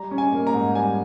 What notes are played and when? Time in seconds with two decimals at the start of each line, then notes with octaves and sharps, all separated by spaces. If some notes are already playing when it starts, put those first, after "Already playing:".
Already playing: G3 A#5
0.11 C#4
0.18 G#5
0.33 A#3
0.47 A#5
0.54 G#2
0.75 G3 G#5